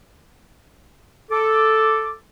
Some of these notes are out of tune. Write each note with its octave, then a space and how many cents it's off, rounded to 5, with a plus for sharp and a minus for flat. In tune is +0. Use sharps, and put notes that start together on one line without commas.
A4 +0 D6 +0